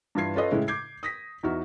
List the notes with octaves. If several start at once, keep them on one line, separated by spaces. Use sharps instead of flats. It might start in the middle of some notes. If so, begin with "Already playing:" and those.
G2 E3 F4 B4 G#6 C7
C#4 F4 A4 B4 D#5
A2 C#3 G#3 E4
D6 G6 G#6 C7
D#6 A#6 B6
E2 D#4 E4 F#4 F6